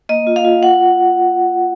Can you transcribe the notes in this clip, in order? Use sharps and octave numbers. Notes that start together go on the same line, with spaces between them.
A#3 D#5
F4
F5
F4
F4 F#5